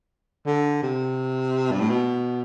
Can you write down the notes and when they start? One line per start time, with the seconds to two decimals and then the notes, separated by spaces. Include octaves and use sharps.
0.46 D3
0.82 C3
1.71 G2
1.80 A2
1.90 B2